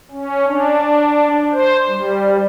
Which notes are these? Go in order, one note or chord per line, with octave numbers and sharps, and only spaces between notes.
C#4
D4
C5
G3